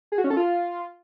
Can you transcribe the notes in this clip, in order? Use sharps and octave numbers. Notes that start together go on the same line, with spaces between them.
G#4
F#4
C#4
A4
F4